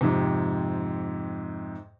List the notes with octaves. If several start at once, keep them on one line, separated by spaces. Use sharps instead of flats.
F2 G#2 C3